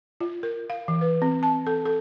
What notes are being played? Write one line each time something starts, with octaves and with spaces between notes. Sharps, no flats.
F4
A#4
F5
E3
B4
C4
A5
A4
A4